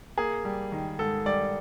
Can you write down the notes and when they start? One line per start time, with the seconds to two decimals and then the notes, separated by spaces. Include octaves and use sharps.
0.18 A#3 G#4
0.45 G3
0.72 D#3
0.99 G#2 A4
1.26 G3 D5